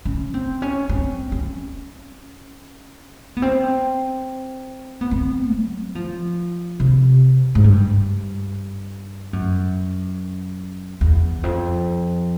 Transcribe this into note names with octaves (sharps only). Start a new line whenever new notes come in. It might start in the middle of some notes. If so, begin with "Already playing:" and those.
C#4
C4
C#4
C4
C#4
B3
C4
B3
C4
F#3
F3
C3
G#2
G2
F#2
E2
F2